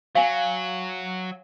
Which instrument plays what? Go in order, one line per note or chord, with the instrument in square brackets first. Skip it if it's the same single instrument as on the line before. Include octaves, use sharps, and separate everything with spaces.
[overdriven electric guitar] F#3 [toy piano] F5 G#5